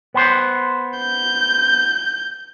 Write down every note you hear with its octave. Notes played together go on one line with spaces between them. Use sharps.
B3 C5
G6